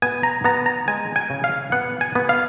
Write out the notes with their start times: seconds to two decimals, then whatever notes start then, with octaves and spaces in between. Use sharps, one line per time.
0.02 B3 G#5
0.23 A#5
0.44 B3 A#5
0.66 A#5
0.88 G#3 G#5
1.16 G#5
1.30 C#3
1.44 F5
1.72 B3 F#5
2.01 G#5
2.15 B3
2.29 F5